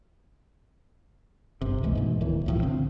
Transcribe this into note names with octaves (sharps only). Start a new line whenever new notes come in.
G1 C3
C#2 E3 G#3 A3
G#2 B2
D1 D#3 E3
C2 A2 F3
D3 C4